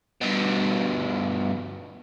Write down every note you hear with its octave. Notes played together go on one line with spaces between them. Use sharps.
G2 B2